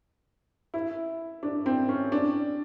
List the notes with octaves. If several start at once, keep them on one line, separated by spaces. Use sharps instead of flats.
E4
D4
C4
C#4
D4